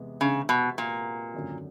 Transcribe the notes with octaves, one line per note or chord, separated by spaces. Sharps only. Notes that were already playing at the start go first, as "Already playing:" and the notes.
Already playing: E2 C3 G#3 B3
C#3
B2
A#2
G#1 F#2 D3